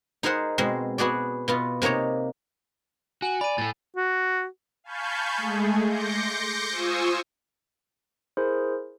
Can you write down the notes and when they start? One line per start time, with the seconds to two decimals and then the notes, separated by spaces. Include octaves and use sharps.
0.23 D#4 G#4 A#4 C5 F#5
0.58 B2 G#3 C4
0.98 B3 F#4 G#4 D5
1.48 B2 B3 F4
1.82 C3 A#3 D#4 C#5 A#5
3.22 F#4 G#5 F#7
3.41 D5 B5 D#7
3.58 A2 A3 A6
3.96 F#4
4.84 F5 G#5 A5 B5 C#6 G6
5.38 G#3 A3 G#4
5.86 C6 D6 G6 A#6 C#7
6.70 F4 C5 G#5 C#6 D#6 E6
8.37 E4 G#4 A#4 C5